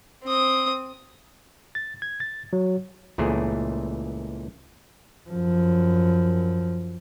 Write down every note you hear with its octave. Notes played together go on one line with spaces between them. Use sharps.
C4 D#6
A6
G#6
A6
F#3
C#2 A#2 E3 A3 G#4
F#2 F3